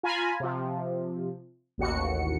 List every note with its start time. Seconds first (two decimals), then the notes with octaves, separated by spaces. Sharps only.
0.03 F4 G#5 A#5 B5
0.40 C3 F3
1.78 A1 D#2 F#4 C#7